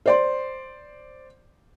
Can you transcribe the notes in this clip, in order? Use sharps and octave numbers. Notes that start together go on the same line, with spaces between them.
C5 D5 C6